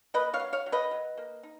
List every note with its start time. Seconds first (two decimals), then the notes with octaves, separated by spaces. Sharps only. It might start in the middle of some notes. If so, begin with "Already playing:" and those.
0.14 A#3 B4 D#5
0.34 C#5 F5
0.40 F#3
0.53 C#5 F5
0.66 F#3
0.72 B4 D#5
0.91 F#3
1.18 A#3
1.43 D#4